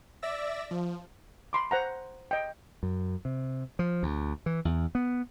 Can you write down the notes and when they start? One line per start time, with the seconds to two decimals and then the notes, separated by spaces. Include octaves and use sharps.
0.22 D5 E5 E6 A#6
0.71 F3
1.53 B5 C6 D6
1.71 C5 F#5 A#5
2.31 D#5 G5
2.83 F#2
3.25 C3
3.79 F3
4.03 D2
4.46 E3
4.65 E2
4.95 B3